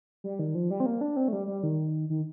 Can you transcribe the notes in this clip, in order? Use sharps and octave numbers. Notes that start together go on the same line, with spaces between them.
G3
D#3
F3
G3
C4
A#3
D4
C4
A3
G3
G3
D#3
D#3